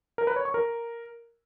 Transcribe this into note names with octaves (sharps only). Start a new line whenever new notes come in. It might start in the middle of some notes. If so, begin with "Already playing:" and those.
A#4
B4
C#5
C#6
A#4